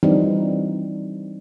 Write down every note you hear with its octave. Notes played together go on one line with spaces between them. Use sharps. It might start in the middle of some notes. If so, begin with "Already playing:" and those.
E3 F3 G3 C4 D4 D#4